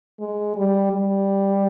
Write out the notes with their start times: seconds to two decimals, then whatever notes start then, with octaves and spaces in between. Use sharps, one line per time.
0.20 G#3
0.56 G3
0.92 G3